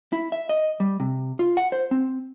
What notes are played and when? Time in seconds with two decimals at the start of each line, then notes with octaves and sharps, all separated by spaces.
0.13 E4
0.32 E5
0.49 D#5
0.80 G3
1.00 C3
1.39 F4
1.57 F#5
1.72 C5
1.91 C4